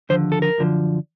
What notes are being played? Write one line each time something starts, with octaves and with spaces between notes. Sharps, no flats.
D#2 D3 F3 C5
A4
A#4
F#2 D3 F3